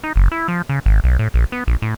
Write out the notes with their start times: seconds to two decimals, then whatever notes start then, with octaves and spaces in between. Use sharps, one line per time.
0.04 D#4
0.16 F#1
0.32 E4
0.48 F3
0.69 C#3
0.86 G#1
1.04 B1
1.19 A2
1.34 A#1
1.52 B3
1.68 A#1
1.82 A2